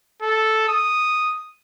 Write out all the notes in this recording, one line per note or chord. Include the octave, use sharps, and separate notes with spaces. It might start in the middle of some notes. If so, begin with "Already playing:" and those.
A4
D#6